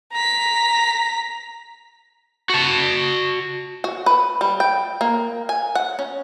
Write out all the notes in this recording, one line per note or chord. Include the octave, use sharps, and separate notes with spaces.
A#5 B6
F#4 A5
F#4
B4
G3
G5
A#3
G#5
F#5
C#4